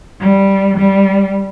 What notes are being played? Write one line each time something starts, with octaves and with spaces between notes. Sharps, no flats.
G3
G3